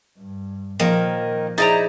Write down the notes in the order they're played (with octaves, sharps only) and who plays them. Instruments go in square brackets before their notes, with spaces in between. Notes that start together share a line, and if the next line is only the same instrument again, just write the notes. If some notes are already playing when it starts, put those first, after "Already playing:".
[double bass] G2
[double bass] A#2 [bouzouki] D#3 [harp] F3 [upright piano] A#3
[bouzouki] D#4 E4 A#5 [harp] G#4 C5 D5 [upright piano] A6 D7